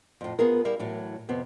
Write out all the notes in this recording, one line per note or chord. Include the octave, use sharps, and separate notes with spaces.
F2 A2
B3 F4 G#4 A#4
G3 E4 A#4 F5
A2 E3 F#3
F2 C3 B3 C4